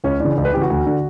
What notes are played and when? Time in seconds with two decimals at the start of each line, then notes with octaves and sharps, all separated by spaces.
0.04 C#2 C#4
0.20 C#3 E3 D4
0.36 C#2 D4
0.45 B4
0.53 E3 G4
0.56 C#3 F#4
0.70 D2
0.86 D3